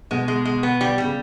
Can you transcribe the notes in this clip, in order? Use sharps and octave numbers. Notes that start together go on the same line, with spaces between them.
B2 G#3
G#3
G#3
B3
G3
G3
C#3